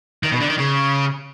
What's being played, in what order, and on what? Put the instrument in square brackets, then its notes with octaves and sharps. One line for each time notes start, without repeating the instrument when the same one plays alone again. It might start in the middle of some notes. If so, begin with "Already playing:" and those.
[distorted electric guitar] D#3
B2
D3
D#3
C#3